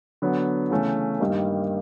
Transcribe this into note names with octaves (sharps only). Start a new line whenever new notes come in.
D3 F#3 B3
C#3 E3 A3 C#4
G2 D#3 G3 A#3 D#4